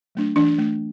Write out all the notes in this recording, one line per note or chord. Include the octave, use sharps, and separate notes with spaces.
F#3 A3 D4
E3 D4
A3 D4